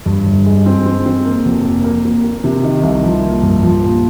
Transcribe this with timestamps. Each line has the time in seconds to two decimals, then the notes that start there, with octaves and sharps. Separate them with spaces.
0.06 G2
0.26 G1
0.46 G#3
0.66 C4
0.86 C4
1.06 C4
1.25 A#3
1.45 F1
1.64 A#3
1.84 A#3
2.05 A#3
2.24 A#3
2.44 C3
2.63 D#3
2.83 C2
3.04 F3
3.24 A#3
3.43 G2
3.63 F3
3.83 A#2